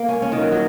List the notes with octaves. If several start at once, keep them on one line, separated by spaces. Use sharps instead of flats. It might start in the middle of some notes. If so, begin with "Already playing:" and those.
Already playing: A#3
C#4
C#4
D#3
F#3
F#3